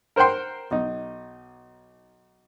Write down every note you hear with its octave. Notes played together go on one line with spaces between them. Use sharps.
A#4 C5 F#5 G5 C6
B1 D#4